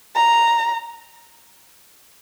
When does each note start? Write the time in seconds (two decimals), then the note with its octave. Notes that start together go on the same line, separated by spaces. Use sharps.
0.15 A#5